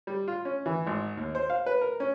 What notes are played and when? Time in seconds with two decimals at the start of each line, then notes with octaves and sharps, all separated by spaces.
0.07 G3
0.28 F4
0.45 C#4
0.66 E3
0.87 G#1
1.17 D#2
1.35 C5
1.50 F5
1.66 B4
1.81 A#4
2.00 C#4